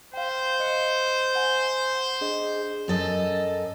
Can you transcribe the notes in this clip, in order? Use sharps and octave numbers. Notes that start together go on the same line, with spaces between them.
C5 F5 G5
D#5 F#6 C#7
F#5 G#5
G6
D4 G#4 D#5
F#2 A4 D#5